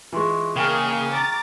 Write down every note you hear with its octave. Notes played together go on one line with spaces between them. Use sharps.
E3 G#3 F4 C6 C#6
C#3 A#3 G#4 G5 C#6 F6
A#5 D6 A6